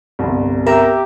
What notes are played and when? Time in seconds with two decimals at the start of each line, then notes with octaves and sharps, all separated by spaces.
0.19 G1 C2
0.66 G4 A#4 E5 A#5